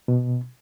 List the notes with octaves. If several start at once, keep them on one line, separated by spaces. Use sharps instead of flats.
B2